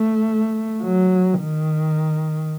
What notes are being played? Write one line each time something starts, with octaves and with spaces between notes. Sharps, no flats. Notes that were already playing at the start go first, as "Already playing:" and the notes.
Already playing: A3
F#3
D#3